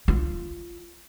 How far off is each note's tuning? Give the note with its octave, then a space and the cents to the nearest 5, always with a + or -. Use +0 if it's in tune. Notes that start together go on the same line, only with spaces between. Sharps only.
F4 -15